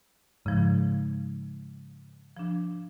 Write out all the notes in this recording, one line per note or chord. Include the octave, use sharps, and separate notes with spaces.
G#2 C#3 F3
F3 D4